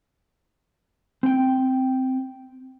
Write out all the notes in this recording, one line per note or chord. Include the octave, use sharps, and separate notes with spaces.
C4 G5